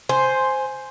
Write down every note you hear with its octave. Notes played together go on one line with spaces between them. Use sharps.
C5 G#5 C6